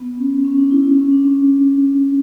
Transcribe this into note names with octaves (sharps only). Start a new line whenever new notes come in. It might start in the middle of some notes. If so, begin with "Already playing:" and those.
Already playing: B3
C#4
C#4
D4
E4
C#4
C#4
D4
C#4